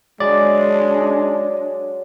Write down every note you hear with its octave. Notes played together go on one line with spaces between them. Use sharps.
F#3 G#3 D4 D5